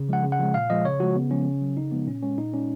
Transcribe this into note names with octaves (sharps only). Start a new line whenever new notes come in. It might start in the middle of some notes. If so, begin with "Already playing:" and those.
Already playing: C#3
F3 G#3 F#5
C#3
F#5
F3 G#3
A#2 F5
F3 G#3 D#5
C#3 C#5
F3 G#3 F#4
C#3 B3
F3 G#3 C#4
C#3
F#3
C#3 D#4
F3 G#3 B3
A#2 C#4
G#3 C#4
A#2 D#4
G#3 C#4